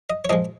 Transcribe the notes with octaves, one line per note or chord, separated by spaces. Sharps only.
D#5
C#5
A#2 F3 G#3 D#5